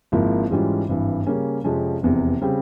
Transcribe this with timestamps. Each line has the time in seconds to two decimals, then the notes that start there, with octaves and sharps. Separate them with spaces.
0.12 G#1 G#2 F3 A#3 E4
0.51 G#2 E3 G3 C#4 F4
0.89 G#1 G2 E3
1.27 C#3 G3 A#3 C#4
1.64 F2 C3 F3 G#3 C#4
2.02 F1 E2 C3
2.42 C#3 G3 C4